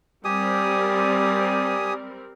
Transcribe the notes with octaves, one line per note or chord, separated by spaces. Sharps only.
G3 C4 G4 A#4 D5 G#5 D#6